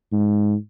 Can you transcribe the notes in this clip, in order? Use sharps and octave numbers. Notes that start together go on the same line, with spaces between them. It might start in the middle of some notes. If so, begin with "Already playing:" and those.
G#2